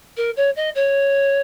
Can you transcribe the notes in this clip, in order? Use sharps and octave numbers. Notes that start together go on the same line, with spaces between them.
A#4
C#5
D#5
C#5